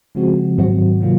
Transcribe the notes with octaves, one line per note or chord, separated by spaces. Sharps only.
C#3 F3 G#3 C4 F#4
G#2 D#3 F#3 C4 F#4
C3 D#3 F#3 A#3 F4